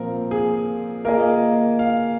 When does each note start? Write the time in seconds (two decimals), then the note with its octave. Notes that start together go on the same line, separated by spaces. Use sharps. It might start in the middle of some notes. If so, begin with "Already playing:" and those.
Already playing: A#2 F3 C4 A#4
0.31 G#4
1.05 A#3 F4 G#4 A#4 D#5
1.79 F5